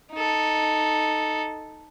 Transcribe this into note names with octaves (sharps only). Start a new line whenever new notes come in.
D#4 A4